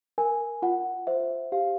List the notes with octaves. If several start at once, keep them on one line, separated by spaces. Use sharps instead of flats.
A#4 G#5
F4 F#5
C5 E5
G4 F5